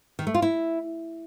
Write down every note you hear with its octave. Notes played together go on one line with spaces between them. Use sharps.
D#3
A3
F4
E4